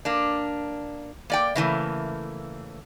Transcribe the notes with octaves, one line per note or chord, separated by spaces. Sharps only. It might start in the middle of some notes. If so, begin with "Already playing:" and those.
A#3 D4
A#3 D5 G5
C#3 E3 A3 A#3